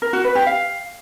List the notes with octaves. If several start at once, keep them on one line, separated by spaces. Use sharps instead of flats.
A#4
F#4
B4
G4
F5